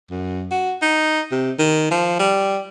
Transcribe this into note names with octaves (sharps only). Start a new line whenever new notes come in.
F#2
F#4
D#4
C3
D#3
F3
G3